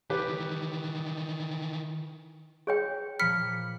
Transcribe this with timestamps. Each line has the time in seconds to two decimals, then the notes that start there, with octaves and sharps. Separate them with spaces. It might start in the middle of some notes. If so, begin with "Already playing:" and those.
0.10 D#3 E3 G4 B4
2.67 G#4 C#5 G5
3.19 A#2 F3 B5 F6 B6 C#7